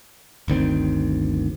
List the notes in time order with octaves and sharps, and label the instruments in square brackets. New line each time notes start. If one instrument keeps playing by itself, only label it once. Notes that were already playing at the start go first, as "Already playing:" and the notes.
[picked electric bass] G1 D2 D#3 C4